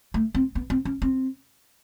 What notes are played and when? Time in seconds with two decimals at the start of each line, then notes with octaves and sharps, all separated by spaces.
0.14 A3
0.35 C4
0.55 B3
0.70 C4
0.85 C#4
1.02 C4